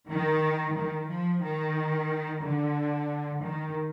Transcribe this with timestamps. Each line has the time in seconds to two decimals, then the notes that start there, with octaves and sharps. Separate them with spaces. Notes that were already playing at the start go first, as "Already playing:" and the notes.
0.09 D#3
0.76 D#3
1.09 F3
1.42 D#3
2.42 D3
3.43 D#3